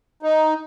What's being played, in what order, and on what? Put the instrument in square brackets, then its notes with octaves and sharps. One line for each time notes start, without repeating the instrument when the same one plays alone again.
[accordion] D#4